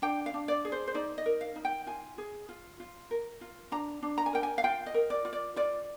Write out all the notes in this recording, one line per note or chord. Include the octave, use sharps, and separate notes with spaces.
D4 G5
F5
D4
D5
G#4
C5
C5
D#4 D5
D#5
A#4
F5
D#4
G5
F4 G#5
G#4
F4
F4
A#4
F4
D4 A#5
D4
A#5
G#5
A#4 G5
G#5
F5
F4 G5
D#5
A#4
D5
F4
D5
F4 D5